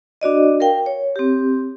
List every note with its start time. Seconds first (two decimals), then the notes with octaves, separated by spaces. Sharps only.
0.21 D4 F#4 D5 D#5
0.60 A#4 F5 G5
0.86 C#5
1.16 C4 G4